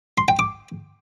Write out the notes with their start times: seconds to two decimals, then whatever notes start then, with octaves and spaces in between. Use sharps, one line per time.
0.18 C6
0.28 G5
0.39 D6